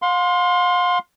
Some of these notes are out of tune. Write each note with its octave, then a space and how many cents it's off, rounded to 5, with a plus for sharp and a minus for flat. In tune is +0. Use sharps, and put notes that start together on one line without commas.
F5 +40 C6 +0